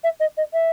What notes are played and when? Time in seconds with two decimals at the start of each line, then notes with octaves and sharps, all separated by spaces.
0.04 E5
0.20 D#5
0.37 D#5
0.53 E5